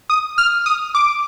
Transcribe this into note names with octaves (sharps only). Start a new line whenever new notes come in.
D#6
F6
D#6
D6